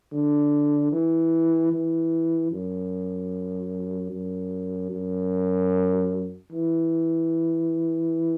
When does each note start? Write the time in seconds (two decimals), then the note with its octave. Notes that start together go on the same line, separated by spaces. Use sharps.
0.12 D3
0.92 E3
1.72 E3
2.51 F#2
4.11 F#2
4.91 F#2
6.51 E3